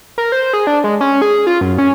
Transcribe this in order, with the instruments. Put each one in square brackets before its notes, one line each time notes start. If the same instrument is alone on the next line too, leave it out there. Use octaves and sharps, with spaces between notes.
[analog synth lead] A#4
C5
G#4
D4
G#3
C#4
G#4
F4
F#2
C#4